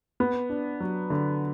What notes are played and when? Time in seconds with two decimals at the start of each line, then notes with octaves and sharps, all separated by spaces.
0.20 B3
0.50 D4
0.80 F#3
1.10 D3